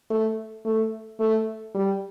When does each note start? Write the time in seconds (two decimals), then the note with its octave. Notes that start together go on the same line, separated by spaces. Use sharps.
0.10 A3
0.65 A3
1.20 A3
1.75 G3